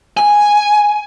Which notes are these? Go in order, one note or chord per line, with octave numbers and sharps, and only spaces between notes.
G#5